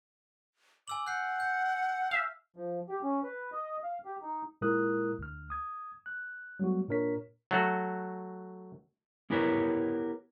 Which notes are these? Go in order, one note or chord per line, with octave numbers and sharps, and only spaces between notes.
G#5 D6 E6 F#7
F#5 F#6 G6 C7
G6
E5 F5 E6
F3
G4
C#4
B4
D#5
F5
G4
D#4
A#2 G#3 E4 A#4 D#6 F#6
D2 F6
D#6 G#6
F#6
F#3 G3 A3 B3 F#4
A#2 D4 A#4 C#5 B6
F#3 A3 F#4
B3 E4 G4 A#4 B4 C#5